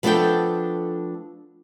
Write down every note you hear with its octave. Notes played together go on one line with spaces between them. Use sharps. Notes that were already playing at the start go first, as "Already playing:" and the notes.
F3 A3 B3 D4 A4 G5